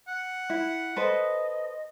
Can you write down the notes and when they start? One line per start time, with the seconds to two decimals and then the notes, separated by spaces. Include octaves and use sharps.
0.08 F#5
0.50 E4
0.96 A4 B4 C5 D#5